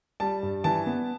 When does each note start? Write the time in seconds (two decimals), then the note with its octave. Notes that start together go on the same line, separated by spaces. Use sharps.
0.20 G3 A5
0.43 G2
0.64 E3 A5
0.87 B3